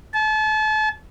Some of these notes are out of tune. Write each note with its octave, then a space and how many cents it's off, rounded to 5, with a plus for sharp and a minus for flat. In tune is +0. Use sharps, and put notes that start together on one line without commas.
A5 -35